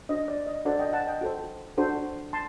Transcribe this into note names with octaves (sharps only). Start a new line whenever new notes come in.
D4 F#4 C5 D#5
D5
D#5
D4 F#4 A4 C5 D5 F#5
D#5 G5
F#5 A5
D#5 G5
F#4 A4 C5
D4 F#4 A4 C5
A5 C6